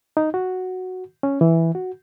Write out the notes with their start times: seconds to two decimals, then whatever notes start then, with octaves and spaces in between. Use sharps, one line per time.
0.17 D#4
0.34 F#4
1.23 C#4
1.41 E3
1.75 F#4